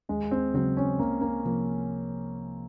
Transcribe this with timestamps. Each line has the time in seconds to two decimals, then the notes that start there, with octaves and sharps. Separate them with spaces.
0.09 D#2 G#3
0.31 C4
0.54 C#3 F#3 C4
0.77 C#4
0.99 C2 A#3
1.21 A#3
1.45 C3 F3 A#3